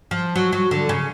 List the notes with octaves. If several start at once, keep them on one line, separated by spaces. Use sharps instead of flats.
F3
F#3
F#3
D3
C#3